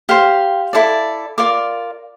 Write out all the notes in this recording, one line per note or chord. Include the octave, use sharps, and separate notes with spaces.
G4 C5 F5
E4 A4 D5
F4 A#4 D5 D6